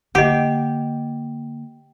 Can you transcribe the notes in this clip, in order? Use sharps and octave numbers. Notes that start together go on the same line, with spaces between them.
D3 A#3 G4 D#5 F#5